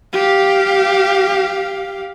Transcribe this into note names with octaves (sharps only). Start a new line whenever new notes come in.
G4 F5